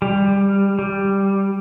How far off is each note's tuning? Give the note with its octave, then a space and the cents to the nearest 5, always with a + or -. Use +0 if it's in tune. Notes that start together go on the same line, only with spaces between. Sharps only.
G3 +15
G3 +0